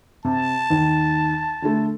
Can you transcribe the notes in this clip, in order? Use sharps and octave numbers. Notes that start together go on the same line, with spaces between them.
C3 A5
D#2
D3 A3